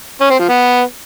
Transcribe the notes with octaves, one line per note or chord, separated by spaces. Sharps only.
C#4
C4
F3
B3